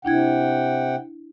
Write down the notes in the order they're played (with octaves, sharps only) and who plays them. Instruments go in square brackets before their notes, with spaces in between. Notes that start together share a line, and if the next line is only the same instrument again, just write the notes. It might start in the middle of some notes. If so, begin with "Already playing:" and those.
[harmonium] C3 F#5 G5 [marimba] D4 E4 G#6